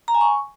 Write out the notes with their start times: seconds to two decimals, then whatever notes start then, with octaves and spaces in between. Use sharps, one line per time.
0.08 A#5
0.14 G#5
0.21 C#6